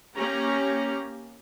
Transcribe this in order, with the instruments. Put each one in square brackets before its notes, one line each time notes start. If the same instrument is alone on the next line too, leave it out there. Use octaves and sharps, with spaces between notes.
[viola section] A#3 C#4 G4 A#5